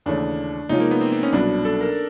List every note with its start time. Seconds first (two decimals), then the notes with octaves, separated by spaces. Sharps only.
0.06 D#2 C#3 E3 A3 C#4 D4
0.69 C3 F3 G#3 C#4 D#4 F4
0.80 A#3
0.91 B3
1.01 C4
1.12 C4
1.23 C#4
1.33 C2 B2 F#3 B3 D4
1.65 A4
1.81 A#4